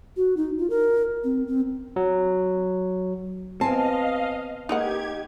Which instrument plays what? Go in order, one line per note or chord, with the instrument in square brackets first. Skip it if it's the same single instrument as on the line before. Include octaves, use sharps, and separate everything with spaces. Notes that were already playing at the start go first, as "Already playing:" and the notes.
[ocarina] F#4
D#4
F4
A#4
C4
C4
[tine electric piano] F#3
[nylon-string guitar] B3 G#5 A5 [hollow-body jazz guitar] C4 [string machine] D#5 F5
[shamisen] G#3 A#3 F#5 [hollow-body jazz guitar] D#4 [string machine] G4 G#6